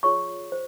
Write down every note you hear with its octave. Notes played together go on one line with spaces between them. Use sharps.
F4 G#4 C#5 C#6
C5